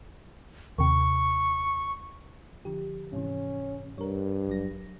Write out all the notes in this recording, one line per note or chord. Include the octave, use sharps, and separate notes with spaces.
D#2 C3 C#6
D3 F3 G4
G#2 C3 E3 C#4
G2 A#4 C#5
G#1 F#3 A#6